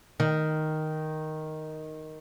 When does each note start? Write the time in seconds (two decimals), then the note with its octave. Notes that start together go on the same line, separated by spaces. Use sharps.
0.20 D#3